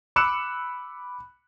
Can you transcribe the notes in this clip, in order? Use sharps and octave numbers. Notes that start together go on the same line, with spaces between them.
B5 D6 E6 F#6 C#7 E7